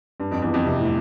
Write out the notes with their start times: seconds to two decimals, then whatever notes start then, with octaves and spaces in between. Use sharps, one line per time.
0.20 G2
0.31 F2
0.42 E2
0.54 F2
0.65 C3
0.79 A2